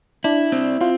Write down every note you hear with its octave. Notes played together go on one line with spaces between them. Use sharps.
D4 E4
C4
C4 F4